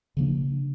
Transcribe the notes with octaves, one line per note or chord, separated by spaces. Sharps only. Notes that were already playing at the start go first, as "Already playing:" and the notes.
C#3 F3 A#3 D4